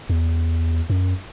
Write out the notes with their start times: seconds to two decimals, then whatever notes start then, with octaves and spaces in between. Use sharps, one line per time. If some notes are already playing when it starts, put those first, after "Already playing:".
0.10 E2
0.90 F#2